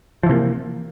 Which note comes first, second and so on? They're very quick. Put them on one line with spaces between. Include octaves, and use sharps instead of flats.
F3 E3 C3 A#3